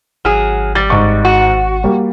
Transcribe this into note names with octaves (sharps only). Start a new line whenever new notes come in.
G#1 F#3 G#4 F6
G3 A6
G#2 D#5 C#6
F#4
G3 A#3